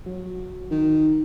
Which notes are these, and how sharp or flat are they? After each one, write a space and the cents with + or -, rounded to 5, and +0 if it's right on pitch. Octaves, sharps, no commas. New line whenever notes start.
F#3 -15
D#3 -5